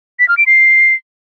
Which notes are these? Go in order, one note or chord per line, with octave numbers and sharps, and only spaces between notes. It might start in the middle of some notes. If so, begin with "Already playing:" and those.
B6
F6
D7
C7